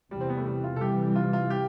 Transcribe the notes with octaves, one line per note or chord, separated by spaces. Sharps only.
E2 C3 E3 G3
C4
B3
A3
G3
F4
A4
C3 E3 G3 G4
F4
F4
G4